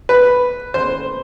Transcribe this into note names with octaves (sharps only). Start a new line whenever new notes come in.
B4
C5